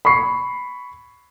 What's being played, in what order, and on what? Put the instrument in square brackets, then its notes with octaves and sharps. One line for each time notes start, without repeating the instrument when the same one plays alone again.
[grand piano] B5 C#6 C7